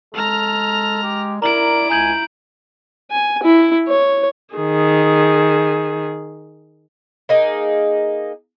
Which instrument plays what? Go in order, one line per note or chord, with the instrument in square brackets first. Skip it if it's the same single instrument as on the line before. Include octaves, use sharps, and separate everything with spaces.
[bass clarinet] G#3 [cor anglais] A4 [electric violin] A#5 F6
[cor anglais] G4
[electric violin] E4 D7 [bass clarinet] A#4 [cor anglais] D5 [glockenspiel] A#5 F#7
[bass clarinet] C#2 [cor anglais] G#5 [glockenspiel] A#5 G6 F#7
[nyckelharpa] G#5
E4
C#5
[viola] D#3 G#4
[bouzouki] A#3 D#4 G#4